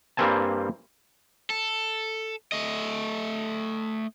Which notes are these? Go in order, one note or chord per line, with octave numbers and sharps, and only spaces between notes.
G2 G3 A#3 C4 G#5 A5
A4
A3 D#5